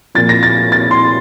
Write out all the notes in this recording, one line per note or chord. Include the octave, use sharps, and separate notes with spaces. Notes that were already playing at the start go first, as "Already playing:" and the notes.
A#2 F3 A6
A#6
A6
A6
C6